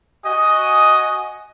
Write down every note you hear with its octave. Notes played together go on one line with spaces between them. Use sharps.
F#4 D#5 G#5 D#6